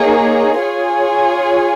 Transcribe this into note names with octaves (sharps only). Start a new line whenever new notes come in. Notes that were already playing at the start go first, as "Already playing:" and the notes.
Already playing: A#3 D#4 G#4 C#5
F4 G#4 C#5 G#5